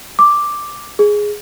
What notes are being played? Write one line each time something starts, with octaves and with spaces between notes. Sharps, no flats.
D6
G#4